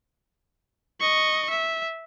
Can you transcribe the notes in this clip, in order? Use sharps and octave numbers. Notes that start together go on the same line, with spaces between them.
D#5 C#6
E5